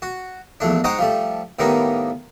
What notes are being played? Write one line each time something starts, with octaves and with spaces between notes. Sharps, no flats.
F#4
A#1 E2 A3 D4
G#3 D#4 C5 C#5 F#5 G5
F3 G3 A3
A2 D#3 G3 A#3 B3 D#4